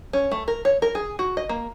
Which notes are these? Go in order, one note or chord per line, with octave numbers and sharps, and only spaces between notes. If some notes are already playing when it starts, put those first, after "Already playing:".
C#4
A3
A#4
C#5
A#4
G#4
F#4
D#5
A#3